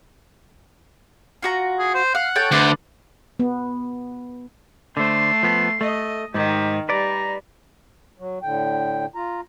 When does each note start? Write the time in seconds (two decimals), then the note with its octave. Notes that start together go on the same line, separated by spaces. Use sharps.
1.42 F4 F#4 A#5
1.79 G#4
1.94 C5
2.15 F5 F#5
2.36 A4 C#5 G5
2.52 D2 D4 A4 B4
3.39 B3
4.97 D3 A3 C5 C6
5.43 F3 B3
5.81 A3 D#5
6.34 G#2 D#3 G4
6.89 G3 B4 D5 A#5
8.19 F#3
8.42 A2 D3 G5
9.15 F4 A#5